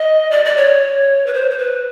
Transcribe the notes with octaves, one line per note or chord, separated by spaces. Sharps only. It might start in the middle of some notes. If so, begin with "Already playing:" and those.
Already playing: D#5
D5
D5
C#5
B4
C5
C5
B4